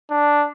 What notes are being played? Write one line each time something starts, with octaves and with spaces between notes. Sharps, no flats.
D4